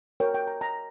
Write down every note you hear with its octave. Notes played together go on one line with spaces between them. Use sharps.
F#4 A#4 C#5 G5
G5
A#5
A#5